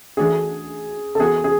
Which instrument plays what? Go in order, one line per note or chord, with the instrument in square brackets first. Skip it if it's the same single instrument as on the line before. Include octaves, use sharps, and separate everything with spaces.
[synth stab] E3 A3 D4 F#4 [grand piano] G#4
[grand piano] A4
[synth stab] E3 B3 F#4 [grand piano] G#4
[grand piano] G#4